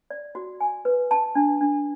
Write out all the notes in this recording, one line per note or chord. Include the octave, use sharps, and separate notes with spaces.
D5
F#4
G#5
B4
A5
D4
D4